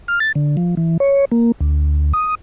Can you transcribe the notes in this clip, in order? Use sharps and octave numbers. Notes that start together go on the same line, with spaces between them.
F6
A6
D3
F3
E3
C#5
A#3
D2
D#6